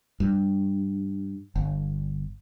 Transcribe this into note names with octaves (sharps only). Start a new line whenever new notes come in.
G2
G1